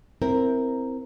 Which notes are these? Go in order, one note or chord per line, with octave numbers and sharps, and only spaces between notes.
C4 E4 A#4